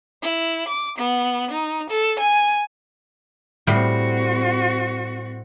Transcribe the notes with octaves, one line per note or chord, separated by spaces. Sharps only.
E4
D6
B3
D#4
A4
G#5
A2 G3 C4 F#4 G5